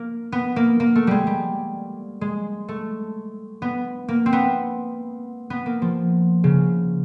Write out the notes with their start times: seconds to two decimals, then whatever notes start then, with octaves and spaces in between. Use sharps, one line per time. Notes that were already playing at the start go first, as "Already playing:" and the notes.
Already playing: A#3
0.32 B3
0.56 A#3
0.80 A#3
0.95 A3
1.07 G3 G#3
1.27 G3
2.21 G#3
2.68 A3
3.62 B3
4.08 A#3
4.26 C4
4.33 B3
5.50 B3
5.66 A#3
5.82 F3
6.44 C#3